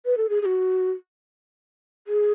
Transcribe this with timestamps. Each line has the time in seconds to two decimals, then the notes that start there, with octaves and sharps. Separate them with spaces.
0.06 B4
0.17 A4
0.29 G#4
0.42 G#4
0.45 F#4
2.07 G#4